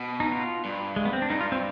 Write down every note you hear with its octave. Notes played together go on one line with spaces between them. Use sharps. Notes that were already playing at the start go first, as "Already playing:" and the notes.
Already playing: B2
D#4
F4
G2
G#3
B3
C4
D4
G2 D#4
F4
C4